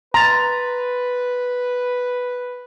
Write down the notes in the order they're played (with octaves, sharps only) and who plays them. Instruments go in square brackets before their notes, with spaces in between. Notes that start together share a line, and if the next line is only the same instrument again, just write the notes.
[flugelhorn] B4 [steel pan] A#5 [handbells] C6 A6